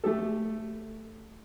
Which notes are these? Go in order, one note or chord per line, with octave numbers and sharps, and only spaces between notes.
A3 G4 A4